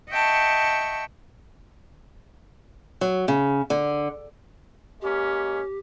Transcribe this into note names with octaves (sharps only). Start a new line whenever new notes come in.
D#5 E5 F#5 G5 A5 C#6
F#3
C#3
D3
G#3 A#3 C#4 G4